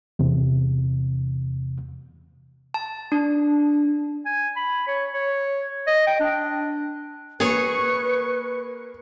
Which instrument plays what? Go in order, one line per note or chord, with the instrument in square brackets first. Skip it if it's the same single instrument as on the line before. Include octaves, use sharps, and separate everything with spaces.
[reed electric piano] E2 C3
[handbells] A5
D4
[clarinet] G#5
B5
C#5
C#5
D#5
G5
D4
[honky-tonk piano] A#3 [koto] G#4 C#5 [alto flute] B4 [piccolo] C#6